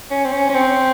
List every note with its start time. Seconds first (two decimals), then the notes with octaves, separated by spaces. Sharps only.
0.11 C#4
0.25 C4
0.32 C#4
0.49 C#4
0.55 C4